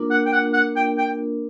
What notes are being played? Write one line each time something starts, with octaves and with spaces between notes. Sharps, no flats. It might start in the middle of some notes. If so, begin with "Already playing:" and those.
Already playing: A#3 D4 F4 A#4
F#5
G5
F#5
F#5
G5
G5